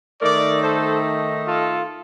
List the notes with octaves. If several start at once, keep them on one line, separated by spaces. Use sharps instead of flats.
D#3 A3 D#4 A#4 D5
A4 C5
F4 A4